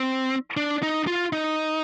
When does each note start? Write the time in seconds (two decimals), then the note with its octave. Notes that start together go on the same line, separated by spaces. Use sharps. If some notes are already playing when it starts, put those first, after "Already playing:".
Already playing: C4
0.57 D4
0.83 D#4
1.07 F4
1.33 D#4